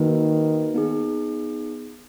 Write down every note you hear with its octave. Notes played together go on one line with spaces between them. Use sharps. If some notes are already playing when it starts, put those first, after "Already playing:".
Already playing: D#3 A#3 D#4 F#4 B4
B3 D#4 G#4